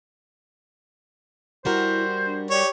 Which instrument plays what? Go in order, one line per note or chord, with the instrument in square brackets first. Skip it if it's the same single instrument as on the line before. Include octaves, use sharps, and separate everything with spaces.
[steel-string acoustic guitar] G3 F#4 A#4 [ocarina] E4 [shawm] C5
[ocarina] D4
[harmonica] G4 C#5 [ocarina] D5